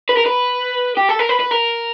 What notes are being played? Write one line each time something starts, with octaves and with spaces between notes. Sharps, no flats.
B4
A#4
B4
G4
A4
A#4
B4
B4
A#4